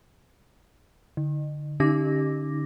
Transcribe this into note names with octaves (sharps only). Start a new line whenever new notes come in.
D3
D3 C#4 D#4 G4 D6 A#6